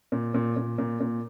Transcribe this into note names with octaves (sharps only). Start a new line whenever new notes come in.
A#2
A#2
A#2
A#2
A#2